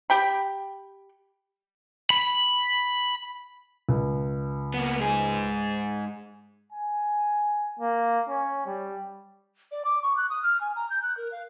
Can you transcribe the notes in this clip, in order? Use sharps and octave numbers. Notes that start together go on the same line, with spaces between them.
G4 G5 B5
B5
C#2
A#3 B3
G#2 G#4
G#5
A#3
C#4
G3
D5
D6
C#6
F#6
D#6
F6
G#5
A#5
G6
F#6
A#4
F5